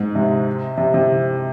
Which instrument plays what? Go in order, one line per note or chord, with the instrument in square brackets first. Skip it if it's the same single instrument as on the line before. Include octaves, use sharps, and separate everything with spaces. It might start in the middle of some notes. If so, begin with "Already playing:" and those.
Already playing: [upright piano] G#2
C3
C3
C3